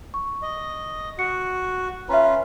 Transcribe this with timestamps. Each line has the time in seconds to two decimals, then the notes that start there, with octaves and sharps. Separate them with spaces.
0.14 C#6
0.42 D#5
1.19 F#4 C#7
2.09 C#4 F4 B4 E5 A#5